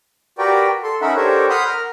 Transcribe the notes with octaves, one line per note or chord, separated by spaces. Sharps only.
F#4 G4 A#4 B4 D5 G5
A4 C6
C#4 D#4 A#4 E5 F#5 B5
D4 G4 A4 A#4 C5 C#5
F#5 B5 C6 D#6 F6 G6
A#4 F6